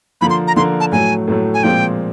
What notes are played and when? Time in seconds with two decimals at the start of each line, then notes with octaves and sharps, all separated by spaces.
0.21 D3 F3 A#3 B5
0.30 C6
0.48 A#5
0.56 D3 F3 A#3 C6
0.80 A5
0.92 A2 F#3 A3 G#5
1.27 A2 F#3 A3
1.54 G#5
1.63 A#2 F3 G#3 C4 G5